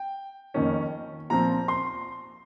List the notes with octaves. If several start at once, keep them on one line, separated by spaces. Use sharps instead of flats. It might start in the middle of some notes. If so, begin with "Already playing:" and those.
Already playing: G5
F2 D#3 A#3 C#4
A#2 F3 C4 A#5
C6